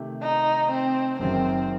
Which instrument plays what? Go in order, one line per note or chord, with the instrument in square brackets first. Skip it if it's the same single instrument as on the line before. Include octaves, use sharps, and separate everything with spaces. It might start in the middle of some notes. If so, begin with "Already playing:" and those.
Already playing: [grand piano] C3 D#3 A3 G4
[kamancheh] D#4
C4
[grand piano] F#1 F#2 D#3 F#3 [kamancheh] C4